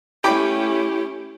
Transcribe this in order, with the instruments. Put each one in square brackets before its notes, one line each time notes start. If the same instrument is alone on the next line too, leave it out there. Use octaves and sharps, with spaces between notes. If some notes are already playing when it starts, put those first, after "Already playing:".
[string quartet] A3 C#4 [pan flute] E4 [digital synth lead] G4 [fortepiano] G5 B5 D6